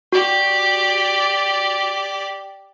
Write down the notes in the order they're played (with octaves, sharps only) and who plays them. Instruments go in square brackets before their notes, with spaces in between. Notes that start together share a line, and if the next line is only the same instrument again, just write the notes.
[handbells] F#4 [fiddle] G4 D5